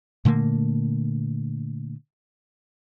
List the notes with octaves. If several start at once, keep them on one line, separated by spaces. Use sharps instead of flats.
A#2 D3 A3 A#3